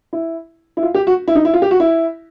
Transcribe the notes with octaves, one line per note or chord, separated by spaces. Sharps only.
E4
E4
F4
G4
F#4
E4
D#4
E4
F4
G4
F#4
E4